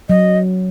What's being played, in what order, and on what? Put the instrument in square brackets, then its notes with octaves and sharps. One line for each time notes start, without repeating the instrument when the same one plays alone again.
[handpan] F#3 [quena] D#5